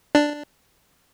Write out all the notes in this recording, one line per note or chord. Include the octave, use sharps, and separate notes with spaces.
D4